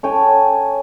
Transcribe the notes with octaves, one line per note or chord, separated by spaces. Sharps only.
A4 C#5 G5 G#5